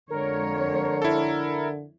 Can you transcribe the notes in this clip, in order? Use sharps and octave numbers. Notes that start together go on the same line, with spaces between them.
F2 D3 G#3 A#4 C#5
E4 A4